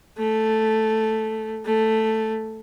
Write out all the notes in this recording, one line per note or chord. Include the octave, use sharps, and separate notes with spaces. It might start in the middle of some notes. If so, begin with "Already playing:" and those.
A3
A3